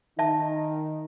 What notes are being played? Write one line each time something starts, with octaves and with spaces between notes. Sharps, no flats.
D#3 D#4 E5 A5